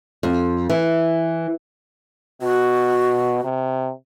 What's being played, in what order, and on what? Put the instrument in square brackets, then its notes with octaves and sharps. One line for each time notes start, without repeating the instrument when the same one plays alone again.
[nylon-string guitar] F2
E3
[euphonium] B2 [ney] F#4
[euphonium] C3